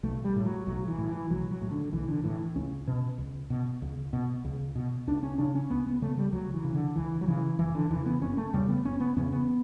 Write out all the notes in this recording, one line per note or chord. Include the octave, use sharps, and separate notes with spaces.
B1 A3
G3
A2
F#3
B1 F#3
E3
A2
E3
B1 F#3
F#3
A2
D3
B1 E3
D3
A2 E3
C#2 C#4
B2
C#2
B2
C#2
B2
C#2
B2
C#2 D4
C#4
C#3 D4
C#4
C#2 B3
B3
C#3 A3
G3
C#2 F#3
E3
C#3
D3
C#2 E3
F#3
C#3 E3
F#1 E3
D3
E2 C#3 E3
B3
F#1 C#4
A3
E2 C#3 G3
B3
F#1 C#4
B3
E2 C#3 C#4
B3